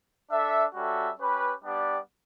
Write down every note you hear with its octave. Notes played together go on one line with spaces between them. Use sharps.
D4 A4 E5
G3 C#4 F#4 A4 E5
C#4 G4 B4
G3 B3 D4 G4 D5